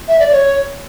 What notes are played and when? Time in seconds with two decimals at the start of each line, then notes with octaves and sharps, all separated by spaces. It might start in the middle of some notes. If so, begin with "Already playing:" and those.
0.08 E5
0.19 D5
0.32 C#5